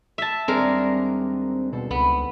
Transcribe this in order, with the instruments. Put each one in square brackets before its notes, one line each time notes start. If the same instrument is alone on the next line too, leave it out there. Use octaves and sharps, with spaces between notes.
[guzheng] E5 A5
[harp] D#2 G3 D4 [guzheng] G#3 A#4 [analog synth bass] C4
[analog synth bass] B2 [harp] C4 A4
[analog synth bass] C#2 [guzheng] B3